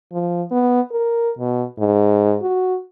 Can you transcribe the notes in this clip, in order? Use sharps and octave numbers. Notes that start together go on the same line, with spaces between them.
F3
B3
A#4
B2
G#2
F#4